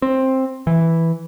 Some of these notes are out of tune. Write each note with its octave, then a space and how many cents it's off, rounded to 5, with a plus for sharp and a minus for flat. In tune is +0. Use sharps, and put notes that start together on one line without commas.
C4 +10
E3 +0